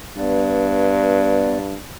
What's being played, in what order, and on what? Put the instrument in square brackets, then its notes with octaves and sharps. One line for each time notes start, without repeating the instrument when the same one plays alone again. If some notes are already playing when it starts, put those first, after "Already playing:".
[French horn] G2 [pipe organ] B3 B4 D5